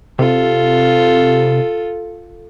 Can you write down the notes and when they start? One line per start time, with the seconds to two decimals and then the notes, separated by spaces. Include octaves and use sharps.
0.19 C3 F4 A4